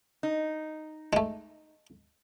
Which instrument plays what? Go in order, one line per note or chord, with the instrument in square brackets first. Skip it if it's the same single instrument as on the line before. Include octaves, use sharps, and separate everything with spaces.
[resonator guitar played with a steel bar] D#4
[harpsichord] G#3 A3